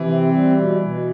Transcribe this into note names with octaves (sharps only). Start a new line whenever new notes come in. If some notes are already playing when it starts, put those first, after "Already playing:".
Already playing: C3 E3
C4
G3
B2
B2